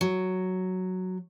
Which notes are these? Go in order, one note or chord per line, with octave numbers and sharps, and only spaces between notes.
F#3